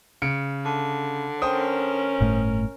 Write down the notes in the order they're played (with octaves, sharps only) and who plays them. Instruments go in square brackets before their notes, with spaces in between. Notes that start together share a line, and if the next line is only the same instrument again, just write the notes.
[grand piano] C#3 C#7 D7
[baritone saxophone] D3
[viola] C#4 A#4 [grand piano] C5 G5 D#6
[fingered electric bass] G1 A2 A3